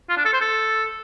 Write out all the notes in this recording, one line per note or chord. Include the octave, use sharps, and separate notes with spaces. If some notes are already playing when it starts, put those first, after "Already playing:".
F4
D4
A4
C5
A4